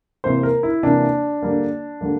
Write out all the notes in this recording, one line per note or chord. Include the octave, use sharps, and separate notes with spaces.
C3 E3 A#3 C5
A#4
E4
C3 E3 A#3 D4
D3 G3 A#3
D3 G3 A#3